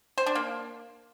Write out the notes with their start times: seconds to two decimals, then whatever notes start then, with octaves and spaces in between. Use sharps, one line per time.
0.18 C5
0.26 D4
0.35 A#3